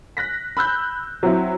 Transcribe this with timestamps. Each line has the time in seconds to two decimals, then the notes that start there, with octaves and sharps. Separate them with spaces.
0.17 F#6 A#6 B6
0.57 B5 E6 F#6 G6
1.23 F#3 C4 E4